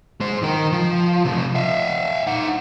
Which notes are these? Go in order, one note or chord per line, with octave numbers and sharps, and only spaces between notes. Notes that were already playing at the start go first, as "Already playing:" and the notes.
G#3 C5
D#3 A#4
F3
C3 F3
E5 F5
D#4 F#5